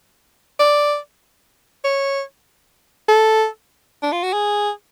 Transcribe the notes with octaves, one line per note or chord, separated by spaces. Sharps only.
D5
C#5
A4
D4
F4
F#4
G#4